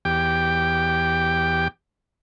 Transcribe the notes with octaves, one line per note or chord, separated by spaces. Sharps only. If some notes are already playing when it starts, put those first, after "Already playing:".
E2 G4 G5